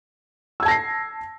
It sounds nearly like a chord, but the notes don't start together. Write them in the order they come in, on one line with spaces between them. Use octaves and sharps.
E6 G#6 A5 A#6 C7